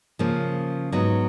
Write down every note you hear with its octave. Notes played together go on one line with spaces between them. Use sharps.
C#3 F3 A#3
G#2 F#3 B3 D#4